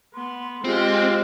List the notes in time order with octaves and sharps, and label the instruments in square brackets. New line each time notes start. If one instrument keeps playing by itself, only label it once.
[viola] B3 [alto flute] C6
[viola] G#3 G4 [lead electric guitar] C4 [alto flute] F4